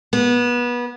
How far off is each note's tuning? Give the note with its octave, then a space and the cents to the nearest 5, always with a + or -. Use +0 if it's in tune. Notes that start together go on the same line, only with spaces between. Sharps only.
B3 -25